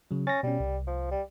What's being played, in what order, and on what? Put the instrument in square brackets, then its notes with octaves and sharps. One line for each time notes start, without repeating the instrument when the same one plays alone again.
[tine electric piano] C#3 F#3
[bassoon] C#4 [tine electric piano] A6 A#6
[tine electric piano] B2 C#4 [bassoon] G3
[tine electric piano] C2
[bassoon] F3
G3